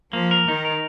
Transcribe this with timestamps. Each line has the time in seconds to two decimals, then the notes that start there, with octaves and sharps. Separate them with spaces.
0.13 F3 A#3
0.31 A#4
0.48 D#3 D#4
0.65 A#4